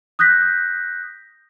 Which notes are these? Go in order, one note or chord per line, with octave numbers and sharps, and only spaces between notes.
D#6 F#6 G6 A#6 B6